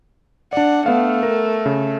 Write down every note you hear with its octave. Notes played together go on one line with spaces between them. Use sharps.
D4 D5 F#5
A3 B3 F5
A#4
C#3